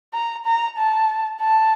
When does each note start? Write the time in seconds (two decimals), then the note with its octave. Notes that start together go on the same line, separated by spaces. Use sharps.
0.14 A#5
0.46 A#5
0.78 A5
1.41 A5